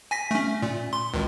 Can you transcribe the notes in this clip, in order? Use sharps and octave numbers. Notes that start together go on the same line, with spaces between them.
G#5 A#6 B6
A3 C#4
A#2
C6
G#1 C#2